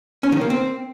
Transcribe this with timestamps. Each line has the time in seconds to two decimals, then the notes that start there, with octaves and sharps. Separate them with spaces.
0.23 C#4
0.32 D#3
0.41 A#3
0.50 C4